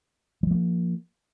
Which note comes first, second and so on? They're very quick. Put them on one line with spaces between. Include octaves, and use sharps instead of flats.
F#3 F3 A3 A#3